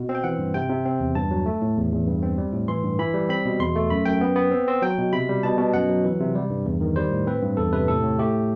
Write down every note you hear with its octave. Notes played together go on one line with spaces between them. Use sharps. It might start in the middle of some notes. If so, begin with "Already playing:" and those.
Already playing: B2
C4
G5
E3 F#5
G2
C3 G5
C3
C4
E2
G2 A5
F#3
A3
A2
E2
E2
G2
C4
G3
A2
E3 C6
G2
E3 B5
G3
C4 B5
B2
E2 C6
A3
F#2 B5
F#2 G5
B3
B3
C4
C4
F#3 G5
B2
C3 B5
G3
B2 A5
B2
F#2 F#5
F#3
E3
C3
G3
G2
E2
D#3
G3 C5
A2
C4 B4
G2
E2 A4
C3 B4
A2 A4
A2
A3 G4